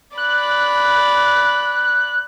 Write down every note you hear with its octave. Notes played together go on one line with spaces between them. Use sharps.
D5 B5 F#6